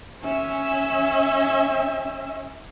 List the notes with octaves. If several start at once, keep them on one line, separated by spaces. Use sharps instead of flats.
C#4 E5